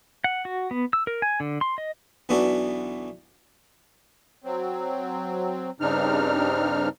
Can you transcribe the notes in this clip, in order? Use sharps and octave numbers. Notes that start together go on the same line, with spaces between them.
F#5
F#4
B3
E6
A#4
G#5
D3
C6
D#5
B1 E3 B3 D4 F#4 A4
F#3 C4
G2 C#3 C4 D4 D#4 F6